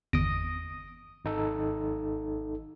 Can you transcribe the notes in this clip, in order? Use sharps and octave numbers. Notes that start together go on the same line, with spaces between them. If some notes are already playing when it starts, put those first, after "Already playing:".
G1 E2 D#6 A#6 D7
G#1 D#4 A4